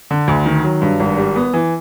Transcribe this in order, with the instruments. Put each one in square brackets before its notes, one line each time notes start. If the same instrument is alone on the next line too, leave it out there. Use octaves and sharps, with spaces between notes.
[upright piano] D3
D2
D#3
F#3
G2
G#1
G3
B3
E3